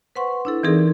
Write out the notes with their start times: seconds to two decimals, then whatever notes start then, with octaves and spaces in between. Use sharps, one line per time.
0.15 B4 C5 F#5 C6 C#6
0.45 D4 E4 A4
0.63 E3 C4 D#4 G#4 A#4 D5